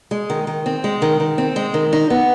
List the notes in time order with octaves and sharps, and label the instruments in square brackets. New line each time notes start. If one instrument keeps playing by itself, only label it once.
[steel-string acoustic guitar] G#3
D#3
D#3
C4
G#3
D#3
D#3
C4
G#3
D#3
D#4
B3